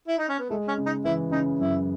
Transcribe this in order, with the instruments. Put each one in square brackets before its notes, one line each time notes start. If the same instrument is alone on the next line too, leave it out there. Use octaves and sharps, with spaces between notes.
[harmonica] E4
D#4
C#4
B3
[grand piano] G#3 [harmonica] A3
[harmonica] C#4
[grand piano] C#3
[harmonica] D#4
[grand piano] E3 [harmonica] E4
[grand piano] C#3 [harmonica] D#4
[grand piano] F#2 [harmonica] E4